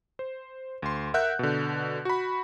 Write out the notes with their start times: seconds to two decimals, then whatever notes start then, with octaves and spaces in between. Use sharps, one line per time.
0.19 C5
0.82 D2 C6
1.14 A#4 E5 F#5 F#6 G6
1.39 B2 D3
2.05 F#4 B5